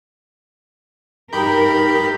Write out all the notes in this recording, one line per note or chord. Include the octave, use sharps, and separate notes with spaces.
G2 D#4 G4 A#4 B5 G6